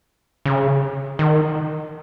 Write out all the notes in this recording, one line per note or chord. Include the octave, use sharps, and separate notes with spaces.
C#3
D#3